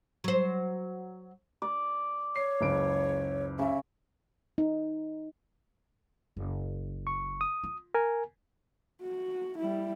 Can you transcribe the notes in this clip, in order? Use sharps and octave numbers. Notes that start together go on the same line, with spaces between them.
F#3 C5
D5
C#5 C7
F#1 C#2 D7
C#3 E5
D#4
F#1
C#6
D#6
F4
A#4 G#5
F#4
G3 E4